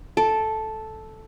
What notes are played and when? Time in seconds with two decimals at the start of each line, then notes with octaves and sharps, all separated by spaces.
0.17 A4